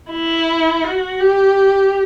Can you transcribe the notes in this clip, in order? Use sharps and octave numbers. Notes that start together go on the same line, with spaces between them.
E4
F#4
G4